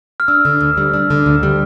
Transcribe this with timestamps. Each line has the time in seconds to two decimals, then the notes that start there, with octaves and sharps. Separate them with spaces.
0.20 F6
0.28 D4 E6
0.45 D3
0.61 D2
0.77 G3
0.93 D4
1.10 D3
1.26 D2
1.43 G3